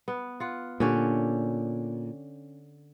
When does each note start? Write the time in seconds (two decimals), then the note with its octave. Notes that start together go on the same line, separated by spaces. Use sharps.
0.08 B3
0.40 F4 F#5
0.80 A#2 D3 C#4 G4